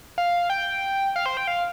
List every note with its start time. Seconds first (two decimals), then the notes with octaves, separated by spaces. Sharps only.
0.18 F5
0.50 G5
1.16 F5
1.26 C5
1.37 G5
1.48 F5